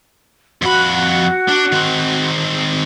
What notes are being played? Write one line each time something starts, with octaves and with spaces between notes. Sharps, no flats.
F2 F#4 B5
D4
D#3 C4